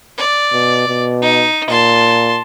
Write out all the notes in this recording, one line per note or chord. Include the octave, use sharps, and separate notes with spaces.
D5
B2
B2
D#4
A#2 A5 C6